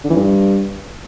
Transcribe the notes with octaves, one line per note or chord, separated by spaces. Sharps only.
D3
E3
G2